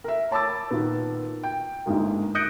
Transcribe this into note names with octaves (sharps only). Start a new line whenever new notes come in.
A#4 E5
C#5 A5 B5 D6 E6 A6
A#2 D#3 B3
G5
G1 G#2 G#3 A#3
D#6 F#6 G6 A#6 C#7 D7